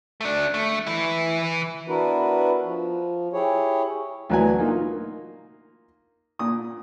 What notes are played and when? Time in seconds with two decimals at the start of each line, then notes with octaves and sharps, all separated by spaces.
0.21 A3 D4
0.54 A3
0.86 E3 E4
1.88 B3 D4 E4 F#4 A#4 B4
2.64 F3
3.33 E4 G4 G#4 C#5
4.30 D2 E3 F#3 F#4 B4 G#5
4.59 A#3 D#4 F4
6.39 A#2 D#6